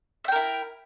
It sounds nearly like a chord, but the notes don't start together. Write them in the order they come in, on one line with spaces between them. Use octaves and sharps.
E5 G5 A#4 E4